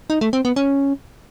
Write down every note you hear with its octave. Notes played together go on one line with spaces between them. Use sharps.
D#4
A3
C4
B3
C#4